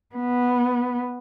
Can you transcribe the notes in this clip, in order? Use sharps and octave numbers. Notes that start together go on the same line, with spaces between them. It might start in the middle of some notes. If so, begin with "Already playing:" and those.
B3